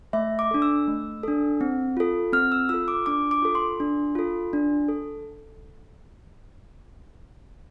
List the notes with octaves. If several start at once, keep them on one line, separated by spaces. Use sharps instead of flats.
A3 E5
D6
D4 A4
E6
A3
D4 A4
C4
F4 A4
C4 F6
E6
F4 A4 E6
D6
D4 D6
D6
F4 A4
C6
D4
F4 A4
D4
A4